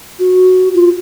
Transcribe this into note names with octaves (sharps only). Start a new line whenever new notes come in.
F#4
F4